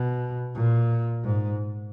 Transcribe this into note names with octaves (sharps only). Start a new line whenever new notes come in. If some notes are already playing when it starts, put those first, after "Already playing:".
Already playing: B2
A#2
G#2